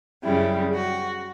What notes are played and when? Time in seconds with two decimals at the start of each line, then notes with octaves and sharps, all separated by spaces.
0.23 F#2 C#3 G3 E4
0.74 F#4